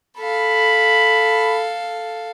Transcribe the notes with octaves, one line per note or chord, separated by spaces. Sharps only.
A4 F5 B5